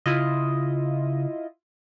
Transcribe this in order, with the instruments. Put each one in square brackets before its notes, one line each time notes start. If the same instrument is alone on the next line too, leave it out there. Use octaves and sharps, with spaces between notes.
[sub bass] C#3 [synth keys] E4 F4 D#5